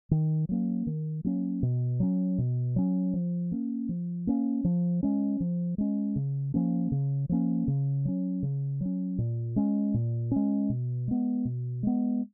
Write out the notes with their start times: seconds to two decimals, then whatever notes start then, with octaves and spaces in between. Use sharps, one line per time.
0.11 D#3
0.49 F#3 A#3 C#4
0.87 D#3
1.24 F#3 A#3 C#4
1.63 B2
2.00 F#3 C#4
2.38 B2
2.76 F#3 C#4
3.14 F3
3.52 A#3 C#4
3.89 F3
4.27 A#3 C#4
4.65 F3
5.03 G#3 C#4
5.40 F3
5.78 G#3 C#4
6.16 C#3
6.54 F3 A#3 C#4
6.92 C#3
7.29 F3 A#3 C#4
7.68 C#3
8.05 F#3 C#4
8.43 C#3
8.81 F#3 C#4
9.18 A#2
9.56 G#3 C#4
9.94 A#2
10.31 G#3 C#4
10.69 B2
11.08 G#3 B3
11.45 B2
11.83 G#3 B3